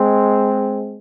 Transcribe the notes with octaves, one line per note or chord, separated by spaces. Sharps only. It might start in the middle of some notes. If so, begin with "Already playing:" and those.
Already playing: G#3 C4